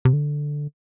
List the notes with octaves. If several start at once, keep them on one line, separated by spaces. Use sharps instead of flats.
C3
D3